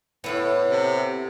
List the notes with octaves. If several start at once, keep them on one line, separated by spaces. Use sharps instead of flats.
A2 B3 E4 C#5
C3